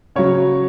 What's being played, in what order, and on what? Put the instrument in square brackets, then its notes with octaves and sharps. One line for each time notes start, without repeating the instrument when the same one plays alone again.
[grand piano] C#3 F#3 C#5